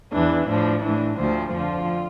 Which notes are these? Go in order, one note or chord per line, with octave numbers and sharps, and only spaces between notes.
E2 E3 D4
A2 F3 D4
A2 E3 D4
D2 D3 F3 C5
F2 D3 F3 F4